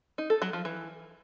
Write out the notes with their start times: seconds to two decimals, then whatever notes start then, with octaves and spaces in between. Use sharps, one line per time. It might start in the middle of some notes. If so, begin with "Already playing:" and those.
0.18 D#4
0.30 A4
0.42 F#3
0.53 F3
0.65 E3